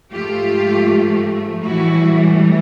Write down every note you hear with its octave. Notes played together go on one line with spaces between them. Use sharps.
G#2 F3 A3 F4 G4
A2 E3 G3 E4 F#4